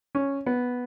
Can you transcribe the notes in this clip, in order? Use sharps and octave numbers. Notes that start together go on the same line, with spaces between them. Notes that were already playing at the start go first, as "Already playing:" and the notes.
C#4
B3